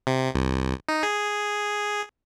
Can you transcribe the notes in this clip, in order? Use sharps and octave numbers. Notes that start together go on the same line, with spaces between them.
C3
C2
D#4
G#4